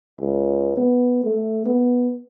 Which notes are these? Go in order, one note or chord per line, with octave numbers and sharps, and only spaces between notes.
C#2
B3
A3
B3